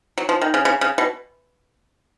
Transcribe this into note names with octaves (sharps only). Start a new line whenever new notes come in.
F#3
F3
D#3
C#3
C#3
C#3
B2